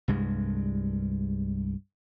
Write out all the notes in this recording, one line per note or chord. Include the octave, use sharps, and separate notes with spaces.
C2 G2 G#3